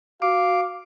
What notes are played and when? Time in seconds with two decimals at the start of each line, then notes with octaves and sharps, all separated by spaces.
0.22 F#4 F5 D6